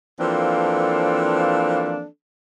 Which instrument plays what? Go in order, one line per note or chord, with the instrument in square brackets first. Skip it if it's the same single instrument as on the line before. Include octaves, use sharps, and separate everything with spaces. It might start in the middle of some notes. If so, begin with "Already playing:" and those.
[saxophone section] E3 F3 A#3 C4 D4 A4